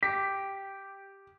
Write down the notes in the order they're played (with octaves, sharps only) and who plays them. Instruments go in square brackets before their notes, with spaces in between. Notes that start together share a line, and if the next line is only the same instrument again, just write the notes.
[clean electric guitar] G4 [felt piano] B6